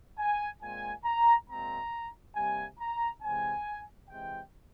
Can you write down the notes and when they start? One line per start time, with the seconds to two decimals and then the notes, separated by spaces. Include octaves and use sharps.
0.18 G#5
0.61 A#2 G#3 C4 G#5
1.04 A#5
1.48 A#2 G#3 C4 A#5
2.35 C3 G3 A#3 G#5
2.79 A#5
3.22 C3 E3 G#3 C4 G#5
4.09 C3 E3 G#3 G5